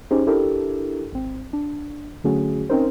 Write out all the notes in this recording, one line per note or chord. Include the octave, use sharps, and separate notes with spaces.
C#4 D#4 G4 G#4 C5
D4 E4 G4 A4 A#4
G#1 C4
D4
D3 F#3 A3 C#4 F#4 G#4
C4 C#4 D#4 A#4 C5